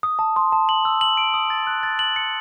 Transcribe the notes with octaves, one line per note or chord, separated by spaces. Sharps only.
D#6
A5
C6
A5
F#7
E6
F#7
D7
D#6
A6
F#6
A6
F#7
C#7